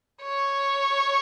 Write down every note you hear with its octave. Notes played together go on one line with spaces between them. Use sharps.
C#5